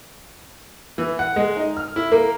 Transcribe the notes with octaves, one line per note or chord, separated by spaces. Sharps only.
E3
F#5
G#3
D#4
F6
E4
A#3